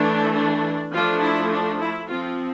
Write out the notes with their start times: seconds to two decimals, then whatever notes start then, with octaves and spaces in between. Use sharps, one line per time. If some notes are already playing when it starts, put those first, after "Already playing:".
Already playing: E3 A3 D4
0.34 D4
0.92 F3 A3 D4 F4
1.21 E4
1.51 D4
1.80 E4
2.08 F3 C4 F4